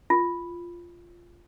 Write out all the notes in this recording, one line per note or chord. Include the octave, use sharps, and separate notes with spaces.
F4